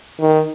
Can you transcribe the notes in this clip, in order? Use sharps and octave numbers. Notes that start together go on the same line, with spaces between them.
D#3